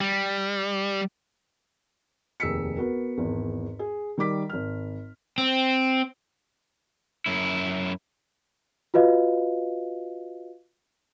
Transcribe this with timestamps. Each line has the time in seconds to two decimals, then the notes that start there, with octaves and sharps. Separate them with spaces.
0.01 G3
2.40 F1 D#2 G#4 E6 B6 C#7
2.76 B3 F#4 A#4
3.17 G#1 E2
3.79 G#4
4.18 D#3 G3 A#4 D6 B6
4.49 G#1 F6
5.38 C4
7.26 F#2 E4
8.94 F4 F#4 B4 D#5 F5